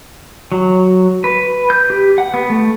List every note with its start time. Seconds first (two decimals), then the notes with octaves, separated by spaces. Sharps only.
0.52 F#3
1.24 B4
1.70 G6
1.90 G4
2.18 F#5
2.34 B3
2.50 A3